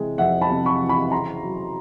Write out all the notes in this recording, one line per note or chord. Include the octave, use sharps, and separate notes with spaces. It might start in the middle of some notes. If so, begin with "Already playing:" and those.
Already playing: C3 E3 G#3
F2 E5 F#5
A5 B5
C3
B5 C#6
E3
B5 C#6
C#3 A#5 C6
F#3